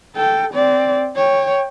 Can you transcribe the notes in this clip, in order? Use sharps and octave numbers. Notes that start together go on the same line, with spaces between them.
A4 G5
C4 D5
C#5 G5